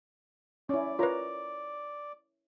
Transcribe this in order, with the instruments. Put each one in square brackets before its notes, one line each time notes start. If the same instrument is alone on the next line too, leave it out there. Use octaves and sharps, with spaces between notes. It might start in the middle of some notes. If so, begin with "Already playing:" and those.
[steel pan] C#4 E4 [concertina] D5
[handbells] F4 B4 [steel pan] A#4 C#5 A#5